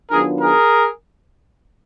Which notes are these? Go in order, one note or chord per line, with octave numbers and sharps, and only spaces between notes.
D#3 F#3 B3 D4 F4 G#4 A#4
G#4 A#4